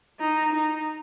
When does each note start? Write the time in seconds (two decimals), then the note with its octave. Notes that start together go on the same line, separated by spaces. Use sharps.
0.20 D#4
0.53 D#4